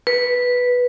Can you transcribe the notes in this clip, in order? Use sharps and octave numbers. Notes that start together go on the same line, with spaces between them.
B4